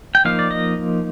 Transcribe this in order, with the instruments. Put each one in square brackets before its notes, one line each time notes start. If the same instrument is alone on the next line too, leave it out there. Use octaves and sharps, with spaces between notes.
[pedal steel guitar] G5
F3 A#3 D#4 F5
D5
D#5